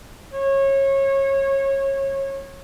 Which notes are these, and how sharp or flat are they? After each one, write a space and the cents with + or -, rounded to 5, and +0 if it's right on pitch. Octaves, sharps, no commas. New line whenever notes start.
C#5 -25